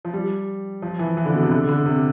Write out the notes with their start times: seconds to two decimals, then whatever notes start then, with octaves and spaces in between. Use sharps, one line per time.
0.05 F3
0.13 G3
0.82 F3
0.99 E3
1.17 E3
1.26 D3
1.34 B2
1.43 C3
1.51 D3
1.68 D3
1.86 C3